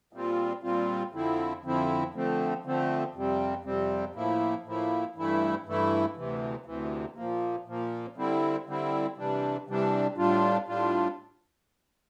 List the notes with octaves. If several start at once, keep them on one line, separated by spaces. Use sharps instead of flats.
A#2 G3 C4 F4
A#2 G3 C4 F4
F2 D3 F3 C4 E4
F2 D3 F3 C4 E4
D3 F3 A3 C4
D3 F3 A3 C4
F2 C3 G3 C4
F2 C3 G3 C4
A2 F3 A#3 E4
A2 F3 A#3 E4
G2 E3 A3 E4
G2 E3 A3 E4
D2 C3 E3
D2 C3 E3
A#2 F3 A#3
A#2 F3 A#3
D3 G3 C4 E4
D3 G3 C4 E4
C3 E3 G3 D4
C3 E3 G3 D4
A2 G3 D4 F4
A2 G3 D4 F4